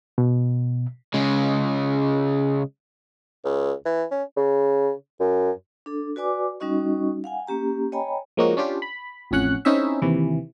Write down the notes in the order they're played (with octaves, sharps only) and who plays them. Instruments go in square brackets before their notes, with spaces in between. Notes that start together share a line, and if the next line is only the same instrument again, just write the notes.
[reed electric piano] B2
[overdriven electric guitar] C#3 G#3
[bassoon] C#2
E3
C#4
C#3
F#2
[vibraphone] D4 A4
F#4 B4 D5 G#5 D6
G3 C#4 D#4 F#4 D#5 C#6
F5 F#5 G#5
A#3 C#4 G4 A#5
C#5 D#5 G5 G#5 A#5 B5
[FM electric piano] F3 G#3 A#3 C#4 D#4 F#4
C#4 D4 F4 G4
B5
A1 F2 C#4 F#5 F#6
C4 C#4 D#4 E4 G#4 E5
D#2 C3 E3